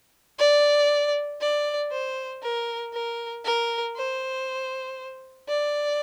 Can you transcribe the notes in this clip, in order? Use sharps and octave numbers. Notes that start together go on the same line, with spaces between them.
D5
D5
C5
A#4
A#4
A#4
C5
D5